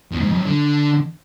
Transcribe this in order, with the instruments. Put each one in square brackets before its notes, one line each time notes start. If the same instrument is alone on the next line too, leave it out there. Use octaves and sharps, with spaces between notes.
[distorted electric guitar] E2
G#2
F2
F#2
D3